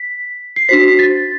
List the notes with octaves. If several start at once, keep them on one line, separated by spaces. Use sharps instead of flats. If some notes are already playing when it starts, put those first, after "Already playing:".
Already playing: B6
C7
D4 F#4 C5 B6
A6